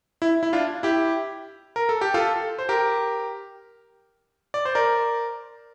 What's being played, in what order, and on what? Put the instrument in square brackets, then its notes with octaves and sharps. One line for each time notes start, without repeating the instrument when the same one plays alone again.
[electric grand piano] E4
E4
D4 F4
E4 G4
A#4
A4
G4
F4 A4
C5
G4 A#4
D5
C5
A#4 D5